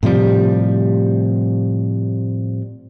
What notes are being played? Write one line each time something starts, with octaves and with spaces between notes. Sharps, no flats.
A2 C3 F3 G3